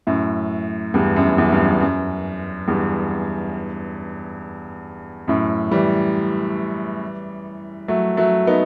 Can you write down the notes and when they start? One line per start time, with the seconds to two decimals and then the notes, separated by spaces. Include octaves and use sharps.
0.07 F#2 A2
0.94 E2 G2
1.16 F#2
1.38 E2
1.52 G2
1.59 F#2
1.81 F#2
2.68 E2 G2
5.28 F#2 A2
5.71 E3 G3
7.88 F#3 A3
8.17 F#3 A3
8.47 B3 D#4